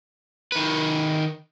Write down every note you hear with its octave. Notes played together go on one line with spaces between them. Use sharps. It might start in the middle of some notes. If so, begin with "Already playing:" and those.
D#3 B4